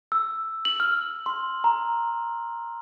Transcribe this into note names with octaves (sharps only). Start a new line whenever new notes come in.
E6
F#7
F6
C6
A#5